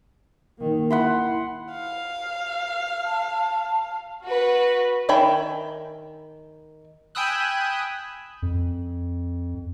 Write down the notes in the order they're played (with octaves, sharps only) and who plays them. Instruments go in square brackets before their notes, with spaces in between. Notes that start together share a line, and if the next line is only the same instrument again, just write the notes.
[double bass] D#3 A#3
[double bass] E4 [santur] F#5 B5 C6
[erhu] F5
[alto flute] A5
[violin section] F#4 B4
[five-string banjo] D#3 E5 G5 G#5 B5
[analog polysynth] G5 G#5 B5 D#6 E6 F#6
[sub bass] F2